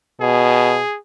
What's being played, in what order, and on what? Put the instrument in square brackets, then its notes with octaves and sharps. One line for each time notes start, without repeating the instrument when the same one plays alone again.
[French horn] B2 [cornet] G#4